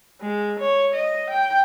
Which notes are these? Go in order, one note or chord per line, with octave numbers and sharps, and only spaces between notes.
G#3
C#5
D#5
G5